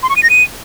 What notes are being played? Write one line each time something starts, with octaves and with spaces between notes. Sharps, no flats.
C6
C#6
D#7
A#6
D#7